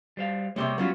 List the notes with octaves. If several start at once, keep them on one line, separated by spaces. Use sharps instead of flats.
G3 C5 F5
C3 G3 G#3 A#3 C5 C#5
F#3 G3 B3 C#4 F4 F#4